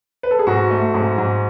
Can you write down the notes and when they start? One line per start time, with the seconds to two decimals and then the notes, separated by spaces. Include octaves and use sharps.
0.23 B4
0.31 A4
0.39 G#4
0.47 G#2 F#4
0.71 A3
0.94 G#2
1.18 G#2